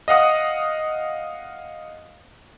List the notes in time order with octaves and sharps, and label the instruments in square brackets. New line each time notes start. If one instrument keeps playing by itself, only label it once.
[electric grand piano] D#5 F5 F#5 D#6